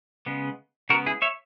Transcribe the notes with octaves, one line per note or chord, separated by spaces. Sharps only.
C#3 G#3 B3
C#3 G#3 B3 F#4 A#4
E4 G#4
C#5 E5